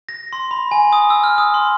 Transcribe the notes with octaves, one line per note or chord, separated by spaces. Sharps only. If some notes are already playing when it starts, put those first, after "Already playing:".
A#6
C6
B5
G#5
D#6
E6
F6
D#6
C6